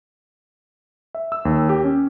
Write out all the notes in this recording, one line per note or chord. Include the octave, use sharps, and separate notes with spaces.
E5
E6
D#2
G4
C#4